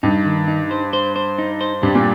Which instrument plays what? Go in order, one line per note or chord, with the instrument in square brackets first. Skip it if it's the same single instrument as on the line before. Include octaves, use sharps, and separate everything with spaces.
[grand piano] G2 [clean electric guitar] D#4
[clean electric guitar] D#3
D#4
C5
C5
C5
D#4
C5
[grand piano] G2 [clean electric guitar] G3
[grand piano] A#2